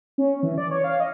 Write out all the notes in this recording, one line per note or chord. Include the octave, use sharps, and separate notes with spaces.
C#4
E3
D5
C#5
F5
D#5